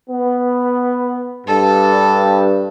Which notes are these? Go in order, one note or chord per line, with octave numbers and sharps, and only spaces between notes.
B3
G2 A4